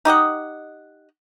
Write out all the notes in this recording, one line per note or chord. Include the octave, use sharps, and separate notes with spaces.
D#4 G4 D#5 F#5